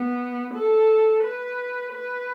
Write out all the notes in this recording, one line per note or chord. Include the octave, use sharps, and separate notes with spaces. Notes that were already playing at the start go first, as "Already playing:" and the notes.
Already playing: B3
A4
B4
B4